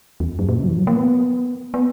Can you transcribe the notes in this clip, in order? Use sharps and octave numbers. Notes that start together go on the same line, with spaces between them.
E2
F#2
A#2
C#3
F#3
E3
F#3
A#3
B3
B3